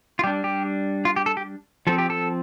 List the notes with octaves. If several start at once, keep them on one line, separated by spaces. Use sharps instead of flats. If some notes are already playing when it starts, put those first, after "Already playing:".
F4
G3 D4 G4
G4
F4
G4
A4
G4
F3 C4 A4
G4
A4